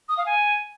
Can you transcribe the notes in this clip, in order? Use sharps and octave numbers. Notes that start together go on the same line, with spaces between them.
D#6
F5
G#5